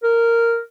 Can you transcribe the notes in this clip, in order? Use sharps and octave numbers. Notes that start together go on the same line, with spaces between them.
A#4